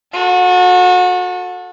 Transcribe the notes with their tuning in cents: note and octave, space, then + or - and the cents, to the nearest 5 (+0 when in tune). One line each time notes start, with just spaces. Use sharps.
F#4 -35 A4 +10